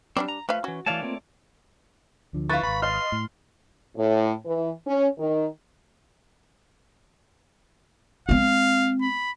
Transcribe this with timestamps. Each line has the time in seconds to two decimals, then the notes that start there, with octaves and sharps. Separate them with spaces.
0.17 F#3 G3 C4 D4 D5
0.29 A#5
0.49 F3 A3 B4 F5
0.64 E3 C#4 F#4
0.86 E3 A3 C#5 D5 F5 A5
1.02 A#3 C4 F4
2.33 D2 D3 F3
2.50 E4 B4 F5 C#6 A6
2.63 D#1 G#1 B5
2.82 D#5 C6 F6
3.12 A2
3.97 A2
4.46 E3
4.86 C#4
5.19 D#3
8.29 G#3 C4 F5
9.02 B5